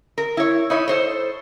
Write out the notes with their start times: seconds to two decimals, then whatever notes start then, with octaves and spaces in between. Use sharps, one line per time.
0.18 A#4
0.37 E4 C#5
0.70 D#4 E4 C#5
0.88 A4 C5 C#5